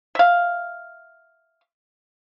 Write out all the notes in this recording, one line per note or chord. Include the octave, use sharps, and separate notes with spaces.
E5 F5